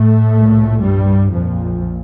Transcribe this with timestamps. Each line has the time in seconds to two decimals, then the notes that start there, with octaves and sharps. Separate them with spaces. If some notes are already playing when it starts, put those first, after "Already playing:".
Already playing: A2 A3
0.31 C2 A#2
0.80 G2 G3
1.29 A#1 F2 A#2 F3